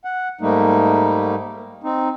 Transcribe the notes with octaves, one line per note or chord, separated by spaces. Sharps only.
F#5
G#2 G3 A3 A#3 D#4
C4 D#4